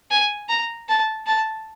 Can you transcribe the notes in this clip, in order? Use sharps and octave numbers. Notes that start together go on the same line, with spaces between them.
G#5
A#5
A5
A5